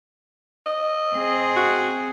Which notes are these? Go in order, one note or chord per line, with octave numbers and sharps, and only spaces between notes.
D#5
C4 G#4
F#4